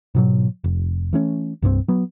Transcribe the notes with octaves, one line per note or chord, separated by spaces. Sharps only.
G#2 B2 F#3
F1
E3 A3 C#4
C2 G2 F3 C4
F#3 B3